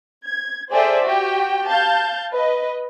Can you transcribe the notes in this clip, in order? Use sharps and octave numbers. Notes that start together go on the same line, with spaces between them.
G#6
G#4 A4 C5 D5 E5 G5
F#4 G4 G5
F5 A5 G6
B4 D#5